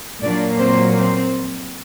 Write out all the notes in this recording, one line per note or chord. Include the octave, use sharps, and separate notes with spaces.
A#2 F#3 A#3 D4 D5
C4 C5
C4 C5